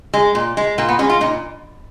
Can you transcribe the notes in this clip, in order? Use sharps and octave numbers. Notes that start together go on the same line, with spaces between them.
G#3
A#2
G#3
A#2 A#3
B3
G#3 C#4
F4
A#2 D#4